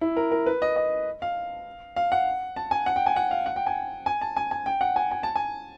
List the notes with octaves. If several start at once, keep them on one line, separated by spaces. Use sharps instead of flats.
E4
A#4
A#4
B4
D#5
D#5
F5
F5
F#5
A5
G#5
F#5
G5
G#5
F#5
F5
F#5
G5
G#5
G#5
A5
G#5
G#5
G5
F#5
G#5
G#5
A5
G#5